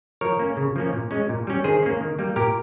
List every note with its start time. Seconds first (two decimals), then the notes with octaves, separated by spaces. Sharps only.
0.21 F3 A#4 C#5
0.39 A#3 C#4
0.57 C#3
0.76 F3 A#3 C#4
0.93 A#2
1.11 G#3 C#4
1.29 A#2
1.47 G3 C#4
1.64 D#3 G#4 C5
1.82 A#3 C#4
2.01 D#3
2.19 G3 A#3
2.36 A#2 G4 A#4